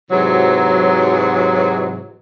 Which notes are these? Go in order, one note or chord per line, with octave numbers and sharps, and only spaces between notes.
G#2 C3 E3 F#3